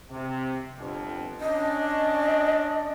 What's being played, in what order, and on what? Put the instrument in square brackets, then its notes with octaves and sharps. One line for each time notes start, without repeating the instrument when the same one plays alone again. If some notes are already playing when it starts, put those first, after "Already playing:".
[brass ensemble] C3
G1 F2
[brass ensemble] C#4 D4 [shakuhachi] D#5